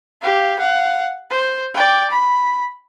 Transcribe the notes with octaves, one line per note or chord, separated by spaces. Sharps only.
G4 F5
F5 F#5
C5
D5 G5
B5